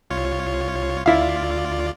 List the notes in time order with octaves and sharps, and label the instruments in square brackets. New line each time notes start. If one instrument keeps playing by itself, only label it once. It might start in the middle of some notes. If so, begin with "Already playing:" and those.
[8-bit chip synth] C2 F4 C#5
[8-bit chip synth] D2 F4 D5 [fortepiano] E4 F5